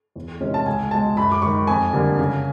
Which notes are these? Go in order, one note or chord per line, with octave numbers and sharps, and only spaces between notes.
E2
C3 D#3 G#3 C#4
A5
C#2 G#5
B2 G#3 A5
F#2 B5
D6
D#3 G#3 C#6
F2 G#5
D3 G3 A#3
C#3